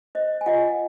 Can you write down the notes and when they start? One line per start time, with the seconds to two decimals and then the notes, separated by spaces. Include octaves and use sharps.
0.15 C5 D#5
0.41 G#5
0.46 F4 D#5 F#5